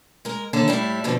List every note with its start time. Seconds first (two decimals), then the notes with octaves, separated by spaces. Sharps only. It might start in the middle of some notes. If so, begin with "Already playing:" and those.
0.25 G#3 A#4
0.53 D#2 D3 D4 A4
0.68 A2 G3 E4
1.04 F2 B2 D3